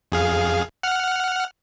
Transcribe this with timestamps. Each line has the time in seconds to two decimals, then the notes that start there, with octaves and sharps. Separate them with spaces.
0.12 F2 G#4 F5
0.83 F#5 F6